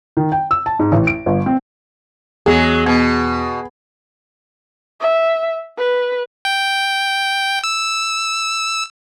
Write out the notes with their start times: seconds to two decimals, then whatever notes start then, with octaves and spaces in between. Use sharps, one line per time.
0.17 D#3
0.32 G5
0.51 E6
0.66 A5
0.79 G#2
0.92 A1
1.07 D7
1.26 G1
1.46 C4
2.46 E2 F#3 G#3 G#4
2.86 B2 B3
5.00 E5
5.78 B4
6.45 G5
7.64 E6